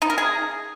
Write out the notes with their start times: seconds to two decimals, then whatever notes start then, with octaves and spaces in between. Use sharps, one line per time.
0.02 D#4
0.10 A#4
0.18 G#4